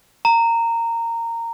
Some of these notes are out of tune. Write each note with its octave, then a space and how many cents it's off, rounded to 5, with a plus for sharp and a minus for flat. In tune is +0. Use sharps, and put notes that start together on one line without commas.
A#5 -15